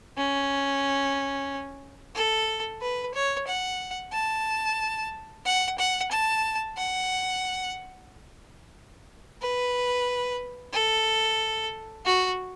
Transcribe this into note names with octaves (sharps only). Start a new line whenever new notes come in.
C#4
A4
B4
C#5
F#5
A5
F#5
F#5
A5
F#5
B4
A4
F#4